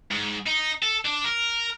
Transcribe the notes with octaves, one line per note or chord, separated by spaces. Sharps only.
G#2
D#4
A4
D4
A#4